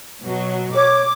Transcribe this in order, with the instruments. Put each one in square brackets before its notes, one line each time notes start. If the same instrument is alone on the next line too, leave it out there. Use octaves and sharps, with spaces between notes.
[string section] B2 F#3
[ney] C#5 [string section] D6